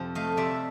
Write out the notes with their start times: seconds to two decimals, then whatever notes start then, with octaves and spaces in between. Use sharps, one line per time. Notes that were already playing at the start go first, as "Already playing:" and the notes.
Already playing: F2 C3 F3
0.15 A3 D#5 F5
0.37 C3 D5 E5